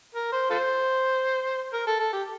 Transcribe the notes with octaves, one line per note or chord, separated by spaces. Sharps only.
A#4
C5
F4 A4 C5
A#4
A4
A4
G4